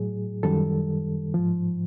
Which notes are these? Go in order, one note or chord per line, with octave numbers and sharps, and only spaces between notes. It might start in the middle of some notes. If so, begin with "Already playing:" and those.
Already playing: A2 F#3 G#4
F#2 D#3 G3 A4
G#2 F3